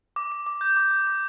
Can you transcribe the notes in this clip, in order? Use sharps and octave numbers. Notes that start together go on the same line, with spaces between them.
D6
D6
D6
G6
D6
D6
D6